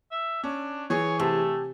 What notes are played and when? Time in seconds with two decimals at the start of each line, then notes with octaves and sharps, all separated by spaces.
0.11 E5
0.44 C#4 D4
0.90 E3 G#4 C#5
1.19 C3 A3 G4 G#5 A5